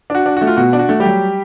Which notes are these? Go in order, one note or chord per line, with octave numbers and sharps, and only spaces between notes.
D4 F#4
D4
A3 F#4
F4
B2 F#4
D4
F#4
A3
G3 G4
F#3